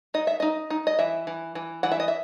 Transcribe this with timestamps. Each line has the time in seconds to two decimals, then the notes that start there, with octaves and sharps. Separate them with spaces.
0.14 D#4 D#5
0.27 E5
0.40 D#4 D#5
0.70 D#4
0.87 D#5
0.99 E3 E5
1.27 E3
1.55 E3
1.83 E3 F#5
1.92 E5
2.00 D#5
2.08 E5